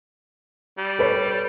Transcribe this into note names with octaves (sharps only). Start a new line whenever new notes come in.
G3
A4 B4 C#5